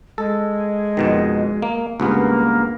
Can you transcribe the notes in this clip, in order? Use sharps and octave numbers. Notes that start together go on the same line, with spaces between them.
G#3 A4
F2 B2 D#3
A#3
C#2 G2 A#3 B3